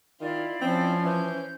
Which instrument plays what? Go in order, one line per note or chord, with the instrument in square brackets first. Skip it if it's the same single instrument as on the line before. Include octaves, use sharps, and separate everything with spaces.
[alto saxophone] D#3 [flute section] E4 D5 F5 [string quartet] F4
[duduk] F3 [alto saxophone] C4 [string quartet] C#4 C5
[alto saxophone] E3 [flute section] G6